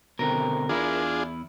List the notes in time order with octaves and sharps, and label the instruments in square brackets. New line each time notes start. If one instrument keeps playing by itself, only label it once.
[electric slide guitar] B2 D3 C4 [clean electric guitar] A#4
[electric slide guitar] E2 E4 [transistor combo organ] D4 F4 G#4